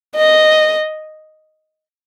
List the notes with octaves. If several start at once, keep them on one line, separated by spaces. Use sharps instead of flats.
D#5